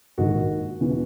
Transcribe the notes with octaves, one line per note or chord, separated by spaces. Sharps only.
A#1 G#2 D#3 F#4
E1 C#3 E3